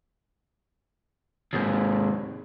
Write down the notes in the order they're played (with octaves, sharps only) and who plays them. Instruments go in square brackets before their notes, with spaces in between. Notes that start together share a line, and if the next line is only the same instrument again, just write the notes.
[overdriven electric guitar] D#2 G#2